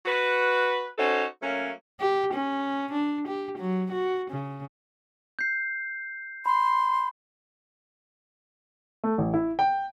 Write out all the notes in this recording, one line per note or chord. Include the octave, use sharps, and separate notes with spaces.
F#4 B4
C#4 D#4 F#4 A4 C5
F#3 A3 A#3 C#4
G4
C#4
D4
G4
F#3
F#4
C#3
G6 C7
B5 C6
A3
A1
E4
G5